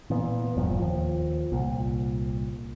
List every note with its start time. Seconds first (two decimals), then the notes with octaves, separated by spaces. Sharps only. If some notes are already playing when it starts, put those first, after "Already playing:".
0.10 A#2 E3 B3
0.57 E1 G2 A#2 F3
0.80 D#2 F3
1.52 C2 A#2